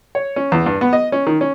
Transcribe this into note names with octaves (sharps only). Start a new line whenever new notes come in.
C#5
C#4
E2
G2
B3
D#5
C#4
D#3
C#4